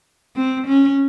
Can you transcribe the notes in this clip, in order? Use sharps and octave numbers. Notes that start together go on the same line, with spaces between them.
C4
C#4